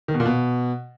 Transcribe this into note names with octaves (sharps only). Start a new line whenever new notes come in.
D#3
B2
A#2
B2